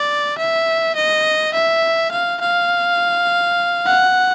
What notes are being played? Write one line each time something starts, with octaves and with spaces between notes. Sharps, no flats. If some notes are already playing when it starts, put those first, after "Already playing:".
Already playing: D5
E5
D#5
E5
F5
F5
F#5